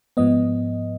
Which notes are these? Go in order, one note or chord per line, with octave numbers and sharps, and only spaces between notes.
G#2 F3 B3 D#5